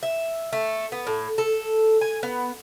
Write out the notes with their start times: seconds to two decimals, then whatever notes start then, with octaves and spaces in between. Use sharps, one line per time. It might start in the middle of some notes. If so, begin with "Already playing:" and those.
0.03 E5
0.53 A3
0.92 B3
1.07 A2
1.38 A4
2.01 G#5
2.23 B3